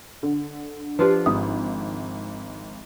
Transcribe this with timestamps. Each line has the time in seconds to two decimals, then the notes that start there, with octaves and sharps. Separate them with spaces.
0.23 D3
0.99 F3 D4 F4 G4 B4
1.26 G#1 D#6